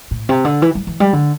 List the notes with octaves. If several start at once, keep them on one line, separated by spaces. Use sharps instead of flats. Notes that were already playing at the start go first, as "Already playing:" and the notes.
A2
C3
D3
E3
G3
E3
G3
D3